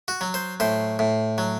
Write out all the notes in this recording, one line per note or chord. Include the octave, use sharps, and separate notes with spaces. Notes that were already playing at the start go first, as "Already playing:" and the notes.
F#4
F#3
C5
A2 C5
A2
F#3